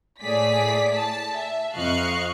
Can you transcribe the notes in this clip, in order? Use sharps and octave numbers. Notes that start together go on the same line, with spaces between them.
A2 G#4 D5 B6
A5
E5
F2 D#5 F5 C#6 F#6